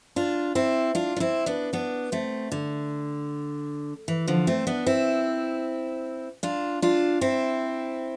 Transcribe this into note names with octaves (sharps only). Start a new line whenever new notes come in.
D4 F4
C4 E4
D4 F4
D4
C4 E4
B3 D4
B3 D4
A3 C4
D3
E3
D3 F3
A3 C4
B3 D4
C4 E4
D4 F4
D4 F4
C4 E4